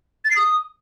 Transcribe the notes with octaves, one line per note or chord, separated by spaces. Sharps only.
A6
C7
D#6